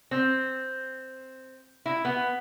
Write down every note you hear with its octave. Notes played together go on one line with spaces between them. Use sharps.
C4
E4
B3